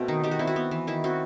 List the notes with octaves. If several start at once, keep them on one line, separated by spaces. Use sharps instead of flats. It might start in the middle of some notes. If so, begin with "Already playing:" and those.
Already playing: B2 A3 C4
D#3 D#4
D#3 G4
F#4
C4 E4
F#4
B3
E3
D#3 E4
C4 F#4